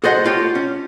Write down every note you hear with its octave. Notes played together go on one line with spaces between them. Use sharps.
F#4 G#4 A4 C5 D#5 F#5
A3 F4 G4 C#5
C#4